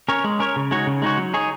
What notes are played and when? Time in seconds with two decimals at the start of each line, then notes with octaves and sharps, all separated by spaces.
0.09 C#4 A#4 C#5
0.24 G#3
0.39 C#4 A#4 C#5
0.56 C#3
0.71 G#3 D#4 F#4 C#5
0.87 C#3
1.02 G#3 D#4 F#4 C#5
1.18 F#3
1.34 D#4 G#4 C#5